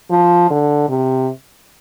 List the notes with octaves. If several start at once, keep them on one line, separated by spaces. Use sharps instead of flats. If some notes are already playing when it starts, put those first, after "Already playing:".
F3
D3
C3